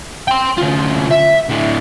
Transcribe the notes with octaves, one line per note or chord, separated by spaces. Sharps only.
G5 C6
D2 F4
E5
A2 D3